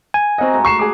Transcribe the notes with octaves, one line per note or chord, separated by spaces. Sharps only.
G#5
C4 F#4 A#4 D#5 F#5
G#2 A3
C#6 C7 E7
G#4 D6